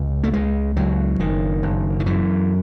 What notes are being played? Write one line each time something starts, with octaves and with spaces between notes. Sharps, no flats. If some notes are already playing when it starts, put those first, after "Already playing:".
Already playing: C#2
A3
C#2 G#3
C#2 F#3
F#1 D#3
F#1
D#3
F#2 E3